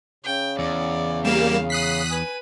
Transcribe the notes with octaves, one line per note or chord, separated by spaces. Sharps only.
C#3 G5
E2 D5
G3 A#3 F5 E7
D#6 F#6 B6 C7
B4 G#5 D#7